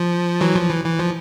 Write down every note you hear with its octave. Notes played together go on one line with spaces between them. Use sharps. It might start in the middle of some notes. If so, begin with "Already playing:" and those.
Already playing: F3
E3 F#3
F3
E3
E3
F3